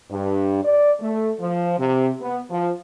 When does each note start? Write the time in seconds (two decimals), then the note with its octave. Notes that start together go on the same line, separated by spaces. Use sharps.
0.11 G2
0.64 D5
1.00 A3
1.40 F3
1.79 C3
2.21 B3
2.51 F3